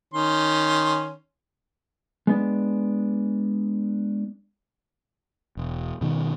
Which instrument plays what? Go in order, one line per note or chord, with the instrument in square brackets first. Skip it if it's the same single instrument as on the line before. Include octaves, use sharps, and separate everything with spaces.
[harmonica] D#3 C#4 C6
[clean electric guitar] G#3 B3 D4
[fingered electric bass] E1
B2 D#3 F#3 G3